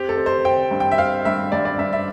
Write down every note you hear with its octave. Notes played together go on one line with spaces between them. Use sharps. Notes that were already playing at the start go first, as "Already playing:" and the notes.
Already playing: C4 G4
A4
C4
C5
C4 G5
G2
G5
E5
C4 F5
G2 E5
G2 D5
D5
G2 E5
E5